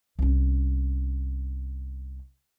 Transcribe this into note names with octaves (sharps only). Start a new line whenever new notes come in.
C2 C#4